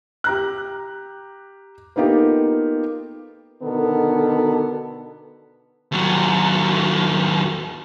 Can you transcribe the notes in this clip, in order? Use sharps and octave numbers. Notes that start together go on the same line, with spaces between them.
G4 A#5 F#6
A#3 B3 D#4 F4 G4 A4
B2 D3 D#3 B3 A4 A#4
D#2 F#3